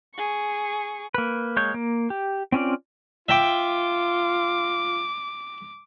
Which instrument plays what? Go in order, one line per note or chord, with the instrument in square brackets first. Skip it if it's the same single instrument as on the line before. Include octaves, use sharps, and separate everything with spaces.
[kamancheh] G#4 C#6
[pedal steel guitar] A#3 B4
G#3 A#3 C#5 G6
A#3
G4
C4 C#4 F4 D5
[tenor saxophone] F4 [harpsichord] E5 G5 [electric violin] D6